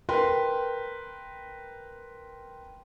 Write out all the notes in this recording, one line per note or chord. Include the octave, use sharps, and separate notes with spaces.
A#4 B4 G5 B5 C6